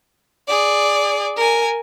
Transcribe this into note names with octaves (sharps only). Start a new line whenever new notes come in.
G#4 D5
A#4 G#5